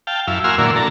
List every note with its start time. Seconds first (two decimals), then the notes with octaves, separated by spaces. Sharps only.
0.07 F5 G5 A5
0.27 F#2 E4 F5
0.44 A#3 F#4 G#5 C6 E6 F6
0.58 A#2 D3 F#3 A#3 E4
0.76 D3 A4 A#5